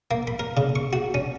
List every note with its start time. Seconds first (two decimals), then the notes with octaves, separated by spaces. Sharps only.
0.11 A#3
0.27 B5
0.39 A#4
0.57 C#3
0.76 C#6
0.93 F#4
1.14 C#4